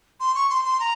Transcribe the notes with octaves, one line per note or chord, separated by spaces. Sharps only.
C6
C#6
C6
C6
A#5